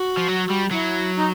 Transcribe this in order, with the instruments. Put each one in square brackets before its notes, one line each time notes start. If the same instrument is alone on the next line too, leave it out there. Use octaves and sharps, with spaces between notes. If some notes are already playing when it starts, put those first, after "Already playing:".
Already playing: [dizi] F#4
[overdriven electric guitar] F3
F#3
G3
[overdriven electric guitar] F#3 [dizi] E4
[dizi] D#4